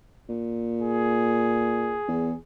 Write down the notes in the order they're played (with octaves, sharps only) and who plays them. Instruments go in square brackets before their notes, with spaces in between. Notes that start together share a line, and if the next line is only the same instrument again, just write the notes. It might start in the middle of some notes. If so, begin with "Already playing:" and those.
[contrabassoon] A#2
[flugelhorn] G#4
[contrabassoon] E2